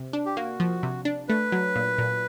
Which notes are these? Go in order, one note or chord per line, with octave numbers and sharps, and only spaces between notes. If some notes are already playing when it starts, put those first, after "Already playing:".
Already playing: C3
D4
G4
A#3 F#4
F3
C3
D4
A3 B4
F#3
A#2
A#2